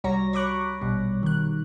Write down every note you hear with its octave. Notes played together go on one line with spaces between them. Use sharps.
C2 G3 F#4 C#5 A#5 A#6
C#5 B5 C#6 D6 F#6
A#1 B2 G3
D#3 F#6